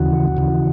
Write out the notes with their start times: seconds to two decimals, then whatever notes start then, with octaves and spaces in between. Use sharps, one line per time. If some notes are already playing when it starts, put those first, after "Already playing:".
Already playing: D#2 C#3 E3 F#4
0.37 D#2 C#3 E3